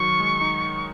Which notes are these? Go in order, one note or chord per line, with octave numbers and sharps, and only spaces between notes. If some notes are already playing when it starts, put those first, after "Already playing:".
Already playing: D#3 F#3 C#6
G#3
D#4